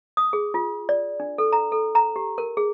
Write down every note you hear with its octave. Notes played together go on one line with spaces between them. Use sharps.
D#6
G#4
F4
D5
D4
A4
A#5
A4
A#5
G4
A#4
G#4